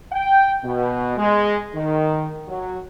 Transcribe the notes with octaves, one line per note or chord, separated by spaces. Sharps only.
G5
B2
G#3
D#3
F#3